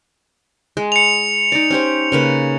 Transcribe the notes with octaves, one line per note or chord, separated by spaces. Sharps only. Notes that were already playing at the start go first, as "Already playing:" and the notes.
G#3
C#7 F7
D#4 D5
C#4 G4 C5
C#3 A#3 B4